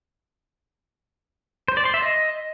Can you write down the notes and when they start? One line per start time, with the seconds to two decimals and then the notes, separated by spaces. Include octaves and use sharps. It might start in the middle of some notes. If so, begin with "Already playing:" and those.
1.68 C5
1.77 D5
1.85 C6
1.94 E5
2.02 D#5